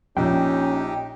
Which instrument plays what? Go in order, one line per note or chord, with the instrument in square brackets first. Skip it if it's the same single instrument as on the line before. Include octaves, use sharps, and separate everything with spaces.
[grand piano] A#1 A#2 [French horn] C#4 [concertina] D#4 G4 [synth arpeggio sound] G5